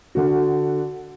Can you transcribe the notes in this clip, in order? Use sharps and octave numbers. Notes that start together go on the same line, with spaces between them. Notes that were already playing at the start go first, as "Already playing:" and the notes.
D3 F#4